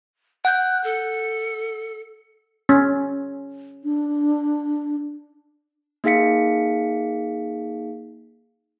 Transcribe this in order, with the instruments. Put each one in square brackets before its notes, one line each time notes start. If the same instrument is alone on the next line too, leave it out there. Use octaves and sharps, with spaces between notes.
[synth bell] F#5 G6 [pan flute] F#6
[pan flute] A4
[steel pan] C#4
[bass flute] D4
[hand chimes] A#3 D#4 G#4 F5 B6 C#7